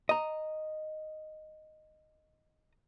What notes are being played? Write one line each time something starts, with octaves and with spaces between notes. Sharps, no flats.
D#5 A#5